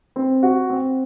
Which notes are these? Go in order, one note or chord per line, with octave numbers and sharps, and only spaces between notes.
C4
F#4
C4